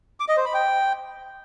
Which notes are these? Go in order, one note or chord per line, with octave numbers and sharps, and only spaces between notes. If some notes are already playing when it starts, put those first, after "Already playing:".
D6
D#5
C5
B5
G5